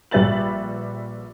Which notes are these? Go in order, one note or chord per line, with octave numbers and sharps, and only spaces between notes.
A#1 G3 B4 E5 A6 F#7